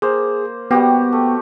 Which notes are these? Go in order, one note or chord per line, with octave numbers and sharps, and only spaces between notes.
A#3 G#4 C5
G3 B3 F#4 G4
A3